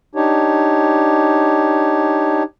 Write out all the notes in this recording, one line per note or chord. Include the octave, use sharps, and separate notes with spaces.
D4 D#4 G4 C#5